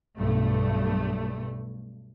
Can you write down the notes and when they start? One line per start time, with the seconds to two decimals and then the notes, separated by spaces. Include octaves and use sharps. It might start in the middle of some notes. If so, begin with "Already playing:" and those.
0.18 B1 G2 A3